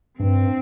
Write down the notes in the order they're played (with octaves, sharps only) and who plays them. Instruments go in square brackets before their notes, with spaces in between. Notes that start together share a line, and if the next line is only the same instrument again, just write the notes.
[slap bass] G2 [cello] C4